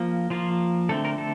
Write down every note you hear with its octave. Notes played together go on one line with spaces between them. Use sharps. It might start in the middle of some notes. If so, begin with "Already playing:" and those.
Already playing: F3 A#3
F3 A#3 F4
D3 A3 C4 A4
A#4
A4